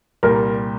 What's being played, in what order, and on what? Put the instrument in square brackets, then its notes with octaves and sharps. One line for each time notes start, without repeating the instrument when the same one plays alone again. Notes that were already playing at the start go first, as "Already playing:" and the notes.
[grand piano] C2 A#2 G3 [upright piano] A#4